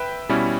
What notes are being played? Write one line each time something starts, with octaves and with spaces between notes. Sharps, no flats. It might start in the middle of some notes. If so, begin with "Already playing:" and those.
Already playing: B4 E5 G5
B2 G3 C#4 E4